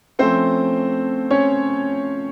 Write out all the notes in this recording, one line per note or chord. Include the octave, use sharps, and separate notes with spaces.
F3 A3 C4 C#4 C5
C#4 C#5